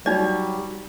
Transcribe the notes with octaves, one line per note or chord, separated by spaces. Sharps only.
F#3 G3 D#4 D5